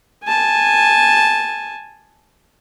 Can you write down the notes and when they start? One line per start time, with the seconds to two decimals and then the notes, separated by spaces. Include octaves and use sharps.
0.25 G#5 A5